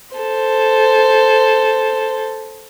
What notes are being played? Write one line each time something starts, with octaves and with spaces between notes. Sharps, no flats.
A4 C5